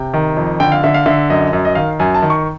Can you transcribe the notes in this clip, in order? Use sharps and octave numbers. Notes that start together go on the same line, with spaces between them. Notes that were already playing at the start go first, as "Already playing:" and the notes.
Already playing: C3 G5
D#3
F2
D3 G5
F5
D3 E5
F5
D3 E5
F#2 D#5
F#2
D#5
D#3 F5
F#2 G#5
A5
D#3
C#6